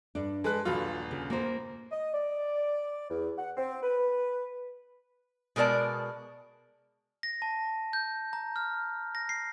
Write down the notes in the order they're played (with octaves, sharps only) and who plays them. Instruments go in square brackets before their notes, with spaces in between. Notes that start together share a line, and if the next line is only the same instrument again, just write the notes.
[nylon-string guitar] G2 D4
[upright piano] G#3 B4 F#6 [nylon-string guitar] G#4 A4
[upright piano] D#1 G2 F4 [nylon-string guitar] F#3 F#4
[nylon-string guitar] C#3
A#3 C5
[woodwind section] D#5
D5
E2
F#5
C4
B4
[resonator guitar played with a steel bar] B2 G#3 A#4 D5 A5
[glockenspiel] A#6
A5
G6
A#5
F6
A#6
C7